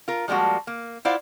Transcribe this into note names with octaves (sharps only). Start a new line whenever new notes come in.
F4 A#4
F3 G3 G#3 A#3 F#4
A#3
E4 F4 C5 D5 F5 F#5